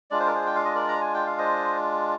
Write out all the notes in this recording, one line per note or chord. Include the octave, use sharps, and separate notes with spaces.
G#3 D4 F4 D5
C5
A#4
G#4 C5
G5
F5
D#5
A#4 D5
A#5
G#5
G5
F5
C5 D#5